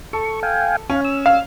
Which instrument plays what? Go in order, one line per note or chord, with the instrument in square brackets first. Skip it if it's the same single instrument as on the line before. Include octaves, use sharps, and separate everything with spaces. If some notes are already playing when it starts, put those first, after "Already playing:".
[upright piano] A4 [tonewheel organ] C#6
[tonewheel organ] F5 G5 G#5
[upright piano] C#4 [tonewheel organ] F5
[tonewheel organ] E6
[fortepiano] F5